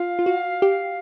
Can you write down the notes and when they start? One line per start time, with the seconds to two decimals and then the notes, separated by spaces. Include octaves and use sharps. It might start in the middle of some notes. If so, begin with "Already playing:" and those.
Already playing: F4 F5
0.19 F4
0.26 F#4
0.62 G4